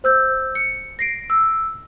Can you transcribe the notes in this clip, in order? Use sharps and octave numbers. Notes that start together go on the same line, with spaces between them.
C5 E6 G6
C#7
A#6 C7 D7
E6